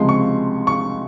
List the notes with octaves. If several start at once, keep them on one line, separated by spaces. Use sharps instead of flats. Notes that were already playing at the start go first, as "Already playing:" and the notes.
Already playing: C#2 C3 F3 G#3 C6
C#6
C#6